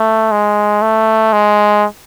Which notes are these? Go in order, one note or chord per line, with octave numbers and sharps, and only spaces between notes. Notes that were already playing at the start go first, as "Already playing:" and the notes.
Already playing: A3
G#3
A3
G#3